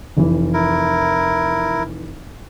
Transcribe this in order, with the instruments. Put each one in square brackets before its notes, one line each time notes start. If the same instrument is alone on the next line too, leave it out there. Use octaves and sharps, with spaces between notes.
[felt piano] F1 E3
[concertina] E4 A#4